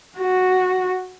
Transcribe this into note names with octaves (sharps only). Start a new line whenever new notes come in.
F#4